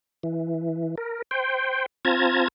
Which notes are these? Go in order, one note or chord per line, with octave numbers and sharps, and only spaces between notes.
E3
A#4
C5 G5
C4 F4 A5 A#5 G#6